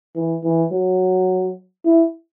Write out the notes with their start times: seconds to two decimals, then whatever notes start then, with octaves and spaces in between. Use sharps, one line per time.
0.15 E3
0.44 E3
0.71 F#3
1.85 E4